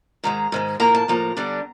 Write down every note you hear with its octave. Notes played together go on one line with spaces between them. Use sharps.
G#2 D#3 G#3 A#5
G#2 D#3 G#3
A2 F3 A#3 A#5
A5
A2 F3 A#3 A#5
D3 G3 B3 D4